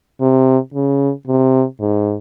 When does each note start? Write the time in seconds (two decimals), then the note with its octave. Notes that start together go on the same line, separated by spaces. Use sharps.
0.21 C3
0.74 C#3
1.27 C3
1.80 G#2